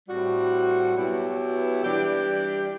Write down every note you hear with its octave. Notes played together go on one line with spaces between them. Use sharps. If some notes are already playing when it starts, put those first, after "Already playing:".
A2 G3 C4 F#4
B2 F#3 B3 E4 G4
E3 G3 D4 G4